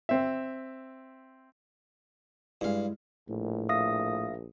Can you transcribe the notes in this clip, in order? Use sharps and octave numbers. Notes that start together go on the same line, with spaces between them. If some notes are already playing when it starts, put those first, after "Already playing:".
C4 E5
G2 G#3 E4 F5
A#1 A2
E5 F5 D#6 A#6